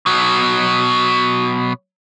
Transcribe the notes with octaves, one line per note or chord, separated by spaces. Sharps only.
B2 F#3